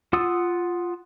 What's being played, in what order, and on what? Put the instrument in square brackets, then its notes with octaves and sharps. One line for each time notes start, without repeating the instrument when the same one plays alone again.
[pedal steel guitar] F4 F#5 D#6 E6